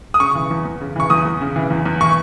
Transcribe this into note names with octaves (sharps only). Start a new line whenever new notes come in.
D#6
C#3 C#6
E3
E2
E2
C#3
E3 C#6
E2 D#6
E2
C#3
E3
E2
E2
E3 C#6